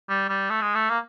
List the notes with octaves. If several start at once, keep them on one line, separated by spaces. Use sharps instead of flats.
G3
G3
A3
G#3
A3
A#3